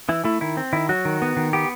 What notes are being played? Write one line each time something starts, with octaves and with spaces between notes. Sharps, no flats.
E3 E4
A3 E4
D#3 E4
C4
D#3 E4
F#3 F#4
D#3
B3
D#3
B3 G4